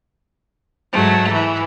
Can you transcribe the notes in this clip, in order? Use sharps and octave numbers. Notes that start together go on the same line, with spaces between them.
G#2 F#3 A3
E3